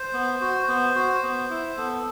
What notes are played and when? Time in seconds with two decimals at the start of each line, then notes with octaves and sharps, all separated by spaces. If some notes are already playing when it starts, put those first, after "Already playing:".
Already playing: C5
0.13 B3
0.41 F#4
0.68 B3
0.95 F#4
1.23 B3
1.50 E4
1.77 B3 A4